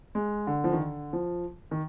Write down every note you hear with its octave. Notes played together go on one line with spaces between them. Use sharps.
G#3
D3
F3
D#3
D3
F3
D#3